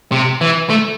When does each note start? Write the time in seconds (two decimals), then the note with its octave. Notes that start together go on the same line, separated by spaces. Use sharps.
0.12 C3
0.41 E3
0.70 A3